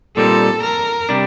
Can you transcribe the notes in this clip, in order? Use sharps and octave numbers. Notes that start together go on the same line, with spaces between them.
A#2 G3 C4 D#4 A4
A#4
C3 G3 D4